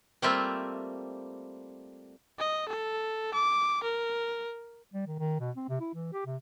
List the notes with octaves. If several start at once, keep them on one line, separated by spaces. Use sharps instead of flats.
G3 A3 A#3 C4 F4 E5
D#5
A4
D6
A#4
G3
D#3
D#3
B2
C4
C3
E4
E3
G4
C3